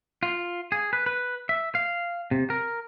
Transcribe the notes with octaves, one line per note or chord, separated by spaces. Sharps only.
F4
G#4
B4
B4
E5
F5
C3
A#4